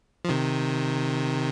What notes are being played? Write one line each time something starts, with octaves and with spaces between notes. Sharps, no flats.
F3
C3 D#3